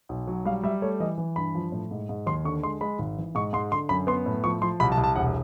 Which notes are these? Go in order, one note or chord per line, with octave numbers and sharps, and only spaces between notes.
B1
F#3
G3 F5
G3 E5
A3 C#5
E3 D#5
E3
G2 B5
F3
A2
G#2
G#2
D#2 C6
D3 C#6
G#3 C6
G#3 B5
G#1
E3
G#2 C#6
G#2 C6
D3 C6
F#2 B5
B3 C6
A2
F3 C#6
F3 C6
C2 B5
A5
C2
A5
E1 F#5